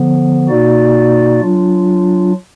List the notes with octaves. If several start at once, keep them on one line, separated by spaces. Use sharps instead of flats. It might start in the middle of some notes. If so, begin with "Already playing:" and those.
Already playing: D3 F3 B3
B2 A#3 D#4 F#4 D5
F#3 D4 F4